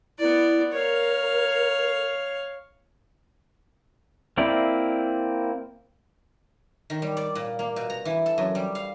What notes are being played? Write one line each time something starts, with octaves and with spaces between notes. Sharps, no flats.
B3 E4 D5
A#4 C#5 F5
A#3 C4 E4 D5
D#3
G3
D5
A#2
A#3
B2
A#5
E3
A4
F#2
G3
F5